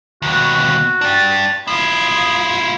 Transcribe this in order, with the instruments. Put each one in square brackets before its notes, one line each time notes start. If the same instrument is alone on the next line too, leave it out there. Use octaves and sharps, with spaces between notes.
[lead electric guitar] D#2 B2 [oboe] F#4
[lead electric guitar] D4 G4 [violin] A6
[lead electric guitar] E4 F4 [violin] C6 G#6 [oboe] D#6